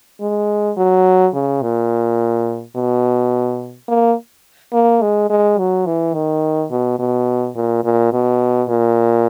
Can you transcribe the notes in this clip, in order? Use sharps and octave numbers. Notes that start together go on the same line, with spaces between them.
G#3
F#3
C#3
A#2
B2
A#3
A#3
G#3
G#3
F#3
E3
D#3
B2
B2
A#2
A#2
B2
A#2